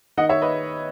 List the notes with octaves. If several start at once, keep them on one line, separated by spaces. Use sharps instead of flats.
D#3 D#5 F#5
C#5 E5
B4 D#5